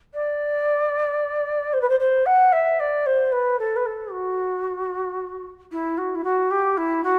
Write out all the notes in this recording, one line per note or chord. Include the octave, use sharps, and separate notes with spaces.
D5
C5
B4
C5
C5
F#5
E5
D5
C5
B4
A4
B4
A4
F#4
E4
F#4
E4
F#4
G4
E4
F#4